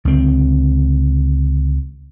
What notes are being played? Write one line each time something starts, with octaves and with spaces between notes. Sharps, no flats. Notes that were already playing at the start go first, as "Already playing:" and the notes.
C#2 D3 C4